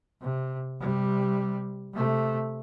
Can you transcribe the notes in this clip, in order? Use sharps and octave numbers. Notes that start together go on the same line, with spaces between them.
C3
C3 G3
C3 A3